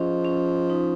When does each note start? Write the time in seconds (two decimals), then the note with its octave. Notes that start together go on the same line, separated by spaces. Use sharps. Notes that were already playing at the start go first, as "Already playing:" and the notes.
Already playing: F3 C#4 G#4 D#5
0.25 C#4
0.70 D#4